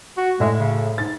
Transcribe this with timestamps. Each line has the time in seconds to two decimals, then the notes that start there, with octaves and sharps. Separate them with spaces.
0.17 F#4
0.40 A2 G#3 A3 E5
0.60 C#3
0.98 G#2 A6